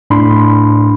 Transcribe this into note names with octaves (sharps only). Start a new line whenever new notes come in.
A2 D4 B5 C6